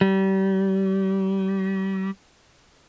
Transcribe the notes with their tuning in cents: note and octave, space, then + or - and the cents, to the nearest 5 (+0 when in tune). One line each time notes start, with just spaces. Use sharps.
G3 -30